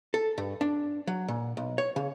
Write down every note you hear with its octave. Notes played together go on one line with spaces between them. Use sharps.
A4
G2
D4
F#3
A#2
B1
C#5
C#3